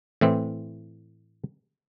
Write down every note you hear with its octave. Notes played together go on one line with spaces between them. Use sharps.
A2 E3 C4